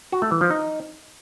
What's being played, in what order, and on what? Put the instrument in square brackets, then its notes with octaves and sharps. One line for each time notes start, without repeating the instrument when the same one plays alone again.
[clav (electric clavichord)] F#4
A3
E3
F3
D#4